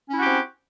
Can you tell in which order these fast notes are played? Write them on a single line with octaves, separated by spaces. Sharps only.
C#4 E4 F#4 G4 C4